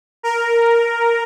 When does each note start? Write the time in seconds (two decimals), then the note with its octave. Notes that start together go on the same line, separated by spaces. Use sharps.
0.23 A#4